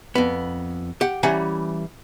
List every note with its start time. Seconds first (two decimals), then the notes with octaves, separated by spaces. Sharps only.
0.15 F2 B3
1.01 G4 F#5
1.23 E3 G3 C#4 F#5 G#5 A#5